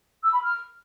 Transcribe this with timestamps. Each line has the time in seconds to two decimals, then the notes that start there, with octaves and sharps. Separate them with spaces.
0.24 E6
0.33 B5
0.42 F6